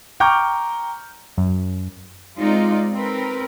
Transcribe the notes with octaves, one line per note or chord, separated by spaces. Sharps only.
G5 A#5 C#6 D6 F6 G6
F#2
G#3 C4 D#4 F4 D5
C4 A#4 B4